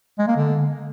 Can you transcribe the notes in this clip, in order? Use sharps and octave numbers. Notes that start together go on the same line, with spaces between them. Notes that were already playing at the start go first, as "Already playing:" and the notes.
G#3
A#3
D3